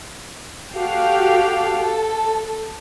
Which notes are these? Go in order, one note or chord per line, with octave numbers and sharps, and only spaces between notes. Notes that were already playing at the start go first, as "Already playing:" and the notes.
F#4 G4 A4 F5 G5
A4